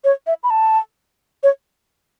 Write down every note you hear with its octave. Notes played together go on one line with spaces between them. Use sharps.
C#5
E5
B5
A5
C#5